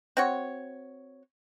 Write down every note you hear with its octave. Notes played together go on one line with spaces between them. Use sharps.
C4 F#4 C#5